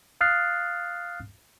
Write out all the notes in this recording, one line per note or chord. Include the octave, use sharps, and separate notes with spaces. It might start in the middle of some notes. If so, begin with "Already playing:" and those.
F5 D#6 F6 F#6 A6 C7